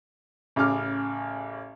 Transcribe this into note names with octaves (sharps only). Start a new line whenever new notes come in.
A1 C#3 D6 F6